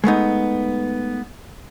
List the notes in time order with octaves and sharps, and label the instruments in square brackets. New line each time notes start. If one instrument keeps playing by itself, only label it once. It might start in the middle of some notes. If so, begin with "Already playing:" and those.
[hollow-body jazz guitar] G#3 A3 B3 D#4